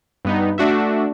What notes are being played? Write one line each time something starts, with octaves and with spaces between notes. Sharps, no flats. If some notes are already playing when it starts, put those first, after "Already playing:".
G2 B3 D#4
A3 D4 F#4 E5